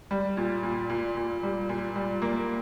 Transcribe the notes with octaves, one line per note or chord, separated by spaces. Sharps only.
G3
A#2
A#2
A#2
A#2
G3
A#2
G3
A#3